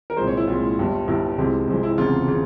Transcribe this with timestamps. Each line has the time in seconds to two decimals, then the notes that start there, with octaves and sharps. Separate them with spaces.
0.10 A#4
0.16 C2 A#2 F3 G#3 C5
0.27 C#5
0.37 E4
0.47 C2 A#2 F3 G#3 F4
0.77 G1 G2 G3
1.07 G1 G2 G3 E4
1.38 C2 C3 F3 G#3
1.68 C2 C3 F3 G#3
1.83 E4
1.98 F1 E2 C#3 F4
2.28 C#3